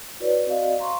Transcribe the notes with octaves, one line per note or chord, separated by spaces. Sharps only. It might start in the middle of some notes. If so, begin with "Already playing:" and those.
E4 F#4 B4 C#5 D5
C4 F#4 D5 D#5 F5
C5 F5 A#5 C6 C#6